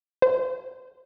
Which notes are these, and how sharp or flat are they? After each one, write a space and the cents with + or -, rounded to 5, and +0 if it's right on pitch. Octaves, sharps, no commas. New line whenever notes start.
C5 -35